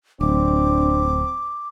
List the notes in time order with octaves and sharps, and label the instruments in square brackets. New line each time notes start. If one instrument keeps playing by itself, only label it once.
[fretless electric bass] D1 [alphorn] C4 [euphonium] D4 [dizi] D6